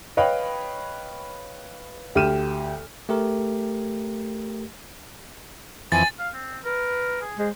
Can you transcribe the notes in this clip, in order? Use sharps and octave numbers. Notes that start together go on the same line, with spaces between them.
B4 C#5 D#5 F5 G5 B5
D2 G4 F6 D#7 E7
A3 G4 A#4
F2 E3 G#5 A6
F5
C4
A#4 B4
G#4
G#3 C5